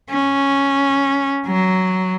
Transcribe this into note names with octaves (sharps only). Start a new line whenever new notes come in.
C#4
F#3